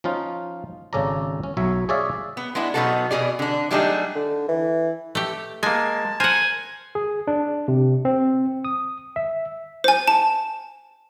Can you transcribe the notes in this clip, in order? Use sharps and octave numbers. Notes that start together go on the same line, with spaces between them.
F3 C#4 D#4 F4
G#1 C#3 C#4 A4 D5 A#5
C#4
B1 F#3 C#5 E5
G#4 C#5 D5 E5 F5
B3
G#3 B3 D4 E4
B2 F3 F#3 B3 D#4 A4
B2 G#4 D5
D3 D4
F#3 G3 A3 D4 D#4 G#4
D3
E3
A3 G4
G#3 A#3 G#5 A5
A#4 C5 F#5 G#5
G#4
D4
C3
C4
D#6
E5
C5 G#5
A5